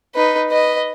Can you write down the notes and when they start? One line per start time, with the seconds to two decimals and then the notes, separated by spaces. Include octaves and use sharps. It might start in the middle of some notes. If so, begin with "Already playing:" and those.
0.15 D#4 B4
0.50 B4 D#5